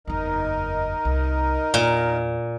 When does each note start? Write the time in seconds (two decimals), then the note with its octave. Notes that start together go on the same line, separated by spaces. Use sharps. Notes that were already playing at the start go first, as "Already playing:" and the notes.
0.07 F#1 E2 D#4 A#4 D#5
1.05 C2
1.74 E2 A#2